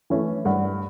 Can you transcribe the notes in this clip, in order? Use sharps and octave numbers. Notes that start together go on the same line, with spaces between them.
E3 A3 C#4
G2 F#5